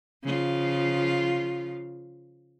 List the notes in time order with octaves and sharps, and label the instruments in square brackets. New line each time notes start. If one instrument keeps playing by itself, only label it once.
[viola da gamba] C#3 F3 F4